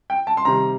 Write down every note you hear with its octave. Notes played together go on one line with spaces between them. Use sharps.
G5
A5
C6
C3 D#3 G3 A#5